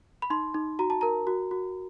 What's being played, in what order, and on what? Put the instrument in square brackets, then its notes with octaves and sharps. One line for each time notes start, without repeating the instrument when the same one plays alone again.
[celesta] B5
D#4 C6
D#4
F#4 A#5
A5
A#4 A#5
F#4
F#4